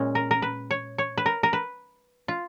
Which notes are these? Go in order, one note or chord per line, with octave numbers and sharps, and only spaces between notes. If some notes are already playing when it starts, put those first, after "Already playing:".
Already playing: A#2 G#3 C#4
A#4
A#4
B4
C#5
C#5
B4
A#4
A#4
B4
F4